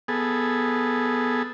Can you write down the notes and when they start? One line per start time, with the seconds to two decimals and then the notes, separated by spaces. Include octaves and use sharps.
0.08 B3 G#4 A4